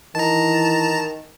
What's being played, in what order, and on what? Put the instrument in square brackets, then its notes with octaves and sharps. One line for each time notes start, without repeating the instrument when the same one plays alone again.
[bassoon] D#3 [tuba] E3 [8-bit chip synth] A5 A#5